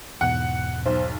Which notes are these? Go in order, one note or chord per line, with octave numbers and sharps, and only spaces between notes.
E2 G#2 B2 F#5
B1 C5